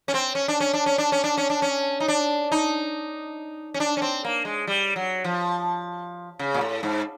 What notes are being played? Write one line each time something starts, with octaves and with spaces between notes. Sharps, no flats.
C#4
C4
C#4
D4
C#4
D4
C#4
D4
C#4
D4
C#4
D4
C#4
D#4
D4
D#4
C#4
D4
C#4
C4
A#3
G#3
G3
F#3
F3
C#3
A#2
A2
G#2